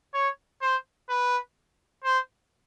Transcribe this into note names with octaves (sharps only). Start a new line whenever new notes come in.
C#5
C5
B4
C5